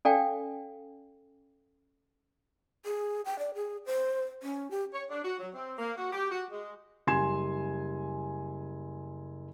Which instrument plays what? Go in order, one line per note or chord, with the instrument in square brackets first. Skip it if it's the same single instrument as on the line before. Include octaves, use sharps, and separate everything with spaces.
[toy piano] C#4 A4 D5 F5 G5 G#5
[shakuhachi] G#4
G5
D5
G#4
C5
C#4
G4
[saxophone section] C#5
D4
F#4
F#3
C4
A#3
F#4
G4
F#4
G#3
[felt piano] F#1 G3 G#5 C6 G#6 E7